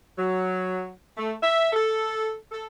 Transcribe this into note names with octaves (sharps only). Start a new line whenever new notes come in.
F#3
A3
E5
A4
A4